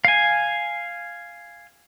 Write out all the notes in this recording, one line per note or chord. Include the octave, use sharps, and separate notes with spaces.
F5 G#5